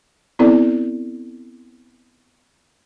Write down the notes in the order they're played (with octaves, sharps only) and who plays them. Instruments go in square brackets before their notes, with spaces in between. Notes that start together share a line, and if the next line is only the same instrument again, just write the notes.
[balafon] B3 C4 E4 A4 D5